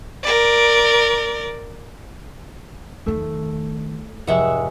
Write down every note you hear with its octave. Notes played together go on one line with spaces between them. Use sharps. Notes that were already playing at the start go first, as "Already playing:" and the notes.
A#4 D5
E2 D#3 A3
F1 G#2 G#3 E5 F#5